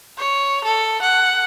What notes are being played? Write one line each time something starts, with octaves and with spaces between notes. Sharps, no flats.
C#5
A4
F#5